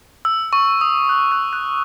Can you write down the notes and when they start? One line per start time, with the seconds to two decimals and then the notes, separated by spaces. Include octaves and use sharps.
0.25 E6
0.53 C#6
0.81 D#6
1.09 F#6
1.32 F#6
1.53 F#6